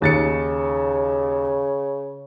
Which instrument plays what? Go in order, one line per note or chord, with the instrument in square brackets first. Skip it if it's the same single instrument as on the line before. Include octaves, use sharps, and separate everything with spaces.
[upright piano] D#2 A6 C#7 [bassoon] C#3